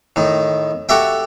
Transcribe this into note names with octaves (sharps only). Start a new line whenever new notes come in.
A2 D#3
F#4 G4 A4 E5 G5